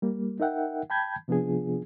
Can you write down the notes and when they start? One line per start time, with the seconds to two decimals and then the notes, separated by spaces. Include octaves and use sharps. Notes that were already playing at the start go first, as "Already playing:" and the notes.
0.02 G3 A#3
0.40 D#4 A#4 E5 F#5 G5
0.90 G5 A5 B5 G6 G#6
1.28 C3 F3 B3 D4 F4 G#4